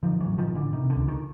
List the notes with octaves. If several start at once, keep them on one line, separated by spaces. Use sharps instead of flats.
D3 D#3 F3
E3 F#3
A1
D#3 F3
A1
D3 E3
C3 D#3
D3
C#2
D#3